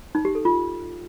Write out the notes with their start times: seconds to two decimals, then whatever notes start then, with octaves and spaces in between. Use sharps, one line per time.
0.15 D#4
0.25 G4
0.35 A4
0.45 F4